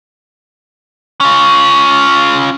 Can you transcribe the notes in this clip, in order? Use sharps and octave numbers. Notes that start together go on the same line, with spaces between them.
C#4 F4